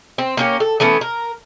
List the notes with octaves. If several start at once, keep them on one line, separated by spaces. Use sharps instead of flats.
C4
A#3 C#4 G4
A4
E3 A3 B3 C#4
A#4